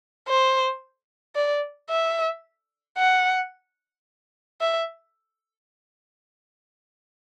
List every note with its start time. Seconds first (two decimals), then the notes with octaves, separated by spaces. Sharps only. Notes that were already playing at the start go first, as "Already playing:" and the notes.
0.28 C5
1.35 D5
1.90 E5
2.98 F#5
4.61 E5